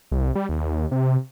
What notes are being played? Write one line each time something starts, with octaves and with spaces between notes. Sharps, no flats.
C2
G3
D#2
C3